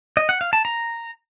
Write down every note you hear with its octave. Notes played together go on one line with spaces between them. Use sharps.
D#5
F#5
F5
A5
A#5